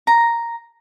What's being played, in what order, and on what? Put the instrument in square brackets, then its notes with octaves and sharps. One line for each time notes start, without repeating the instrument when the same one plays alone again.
[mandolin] A#5